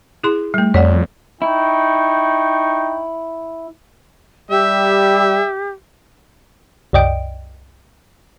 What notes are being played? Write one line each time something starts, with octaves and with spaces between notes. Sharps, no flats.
E4 G#4 C6
G3 A3
F2 C#5 D5 F#5
D#4 E4 G5 C#6
G3 G4 E5
C2 F#2 D5 D#5 G5 D7